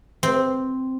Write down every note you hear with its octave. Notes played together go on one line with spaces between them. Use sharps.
C4